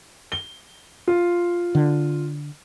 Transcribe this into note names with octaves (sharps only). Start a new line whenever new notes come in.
G7
F4
D3